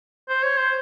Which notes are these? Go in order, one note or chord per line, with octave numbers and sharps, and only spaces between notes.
C5
C#5
C5